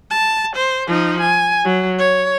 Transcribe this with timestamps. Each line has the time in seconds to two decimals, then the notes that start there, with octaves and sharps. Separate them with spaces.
0.10 A5
0.56 C5
0.87 F3 D#4
1.21 G#5
1.64 F#3
1.99 C#5